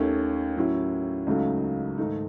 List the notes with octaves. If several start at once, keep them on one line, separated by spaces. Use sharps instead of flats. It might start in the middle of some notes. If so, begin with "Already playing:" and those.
Already playing: D#2 D#3 A3 C#4
A2 F#3 C#4 E4
C#2 C#3 F#3 A3 D#4
G#2 D#3 A3 D#4